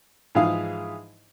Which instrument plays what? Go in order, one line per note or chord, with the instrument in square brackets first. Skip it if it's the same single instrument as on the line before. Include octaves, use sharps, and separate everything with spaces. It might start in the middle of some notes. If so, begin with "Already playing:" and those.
[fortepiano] G#2 E3 F3 G#4 F5